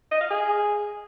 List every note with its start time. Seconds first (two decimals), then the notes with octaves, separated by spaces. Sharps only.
0.11 D#5
0.21 F5
0.30 G#4